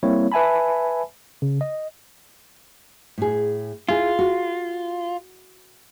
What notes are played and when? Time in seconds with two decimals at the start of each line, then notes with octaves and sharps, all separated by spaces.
0.03 G3 A#3 C4 E4 C#5
0.32 B4 E5 G#5 A5 B5
1.42 C#3
1.61 D#5
3.18 A2 G#4
3.89 E4 F4 G#4
4.19 F#4